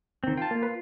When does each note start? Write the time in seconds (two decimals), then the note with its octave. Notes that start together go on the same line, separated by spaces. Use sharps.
0.24 D#3 C4
0.37 F4 G5 A5
0.51 A#3
0.63 B4